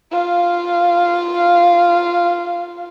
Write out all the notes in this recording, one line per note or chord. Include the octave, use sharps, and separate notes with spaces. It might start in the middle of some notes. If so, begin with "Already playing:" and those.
F4 F5